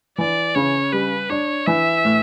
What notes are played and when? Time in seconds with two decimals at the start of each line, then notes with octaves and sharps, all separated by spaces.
0.18 E3 D5
0.55 C#3 C#5
0.93 G3 B4
1.30 D4 C#5
1.67 E3 E5
2.05 A2